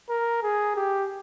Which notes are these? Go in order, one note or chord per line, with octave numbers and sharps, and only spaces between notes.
A#4
G#4
G4